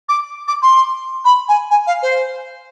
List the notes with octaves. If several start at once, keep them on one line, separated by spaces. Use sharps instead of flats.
D6
D6
C6
B5
G#5
G#5
F5
C5